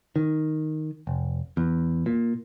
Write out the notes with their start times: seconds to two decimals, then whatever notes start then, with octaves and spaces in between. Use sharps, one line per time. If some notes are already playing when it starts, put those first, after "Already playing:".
0.16 D#3
1.07 F1
1.57 E2
2.06 A#2